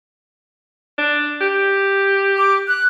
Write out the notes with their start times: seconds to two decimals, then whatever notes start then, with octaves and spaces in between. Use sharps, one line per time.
0.98 D4
1.41 G4
2.37 D6
2.68 F#6